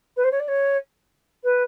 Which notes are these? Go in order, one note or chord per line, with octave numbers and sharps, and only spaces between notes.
B4
C5
C#5
D5
C#5
B4